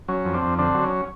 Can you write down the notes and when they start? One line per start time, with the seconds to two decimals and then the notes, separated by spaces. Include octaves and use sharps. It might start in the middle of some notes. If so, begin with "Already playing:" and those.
0.08 F#3 C#4
0.25 F2
0.34 C4 D4
0.42 F2
0.58 D3 C4 D4
0.74 F#3
0.84 C#4